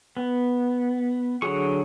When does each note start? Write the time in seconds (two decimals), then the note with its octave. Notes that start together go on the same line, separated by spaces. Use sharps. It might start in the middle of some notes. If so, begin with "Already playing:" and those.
0.17 B3
1.42 D3 F#3 F#4 G#4 C#6